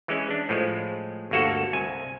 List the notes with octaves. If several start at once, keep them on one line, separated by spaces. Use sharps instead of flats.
E3 G#3 C#4
D4
A2 F3 G#3
G1 D2 A#3 F#4 A4
C2 G#5